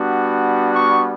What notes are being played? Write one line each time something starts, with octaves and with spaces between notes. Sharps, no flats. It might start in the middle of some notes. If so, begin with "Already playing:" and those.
Already playing: G3 B3 D4 F#4
C#6